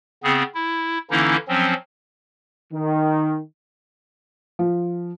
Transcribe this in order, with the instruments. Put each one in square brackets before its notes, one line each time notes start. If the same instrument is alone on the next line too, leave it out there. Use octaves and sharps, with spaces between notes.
[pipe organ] C#3 B3 C4 G#4
E4
D3 E3 A#3 C#4 D#4 E4
F3 F#3 C4 C#4
[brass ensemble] D#3
[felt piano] F3